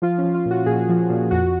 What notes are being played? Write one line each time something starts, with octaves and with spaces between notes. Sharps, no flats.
F3 F4
F3 C#4
F4
A#2
F#4
A#2 G#4
F3
A#2
F2 F#4